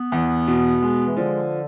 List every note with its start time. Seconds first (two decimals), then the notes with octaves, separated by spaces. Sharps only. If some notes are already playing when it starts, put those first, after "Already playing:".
Already playing: B3
0.12 E2
0.47 B2
0.82 G#3
1.06 E3
1.16 D3 F3